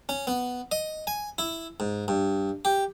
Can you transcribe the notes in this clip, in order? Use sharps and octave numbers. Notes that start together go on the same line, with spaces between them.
C#4
B3
D#5
G#5
E4
G#2
G2
G4